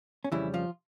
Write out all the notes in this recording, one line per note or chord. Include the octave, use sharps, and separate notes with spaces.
C#4
F2 C#3 E3 G3 E4
F3 F4